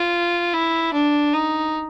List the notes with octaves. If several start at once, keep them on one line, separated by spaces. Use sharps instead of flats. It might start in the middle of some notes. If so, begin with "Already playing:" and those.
Already playing: F4
E4
D4
D#4